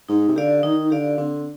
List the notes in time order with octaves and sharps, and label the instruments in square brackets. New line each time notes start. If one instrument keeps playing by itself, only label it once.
[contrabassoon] G#2 [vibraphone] D#4
[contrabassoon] C3
[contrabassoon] D3 [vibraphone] G4 D5 F5
[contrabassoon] D#3 [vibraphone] D#4
[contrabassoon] D3 [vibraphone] G4 D5 F5
[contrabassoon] D3 [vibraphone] C4